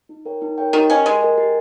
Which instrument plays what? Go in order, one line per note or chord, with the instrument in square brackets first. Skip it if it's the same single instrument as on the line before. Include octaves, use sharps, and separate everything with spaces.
[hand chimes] D#4
A#4 C#5 G5
D#4
A#4 C#5 G5
[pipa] D#3 [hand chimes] G4
[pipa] C#4 [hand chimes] A#4 D#5 G#5
[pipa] G#3 [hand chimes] G4
[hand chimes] A#4 D#5 G#5
G4